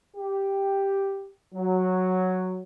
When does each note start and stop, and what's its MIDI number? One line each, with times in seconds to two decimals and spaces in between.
0.17 1.30 67
1.54 2.60 54